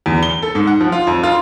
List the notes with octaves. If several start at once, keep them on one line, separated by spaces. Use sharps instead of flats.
E2
G7
A4
G#2
F#5
F3
F4
F2
F4